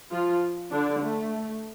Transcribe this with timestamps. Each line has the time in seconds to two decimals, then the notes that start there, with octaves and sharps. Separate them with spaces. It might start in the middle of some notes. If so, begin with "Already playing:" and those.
0.11 F3 F4
0.72 D3 D4
1.02 A3